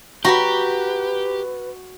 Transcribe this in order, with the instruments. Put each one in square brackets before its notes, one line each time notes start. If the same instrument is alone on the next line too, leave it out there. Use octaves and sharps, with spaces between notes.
[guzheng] F#4 [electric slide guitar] G4 [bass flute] B4 [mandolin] A#5 B5